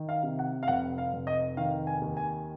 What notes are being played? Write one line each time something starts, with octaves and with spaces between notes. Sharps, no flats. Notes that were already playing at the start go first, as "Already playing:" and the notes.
Already playing: D#3
F5
C3
F#5
F5
F1 F#5
F5
F1
D#5
D#3 F5
G#5
D#2
G#5